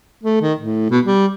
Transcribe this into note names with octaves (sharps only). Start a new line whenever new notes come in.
A3
D#3
A2
B2
G3